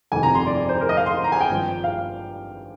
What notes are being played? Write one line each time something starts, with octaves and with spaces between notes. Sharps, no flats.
G1 F2 C3 D#3 G#5
A#5
C6
D5
D5
C5
A#4
D#5
F5
C6
A#5
G#5
G5
G#1 G2 F3
F5